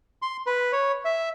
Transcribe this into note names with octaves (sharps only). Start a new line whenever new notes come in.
C6
B4
C#5
E5